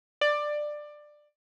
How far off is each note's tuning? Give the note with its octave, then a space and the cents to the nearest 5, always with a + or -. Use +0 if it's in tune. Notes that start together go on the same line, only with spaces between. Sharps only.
D5 +15